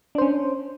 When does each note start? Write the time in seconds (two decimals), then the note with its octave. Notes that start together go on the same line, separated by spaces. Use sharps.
0.15 D4
0.18 C5
0.22 C#4